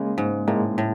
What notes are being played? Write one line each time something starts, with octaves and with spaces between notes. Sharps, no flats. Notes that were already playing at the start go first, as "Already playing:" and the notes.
Already playing: C#3 G#3 A#3
G#2
A2 G#3 A#3
A2